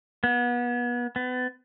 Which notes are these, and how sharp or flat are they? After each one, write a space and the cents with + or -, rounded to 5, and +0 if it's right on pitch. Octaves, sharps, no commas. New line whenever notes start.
B3 -30
B3 +30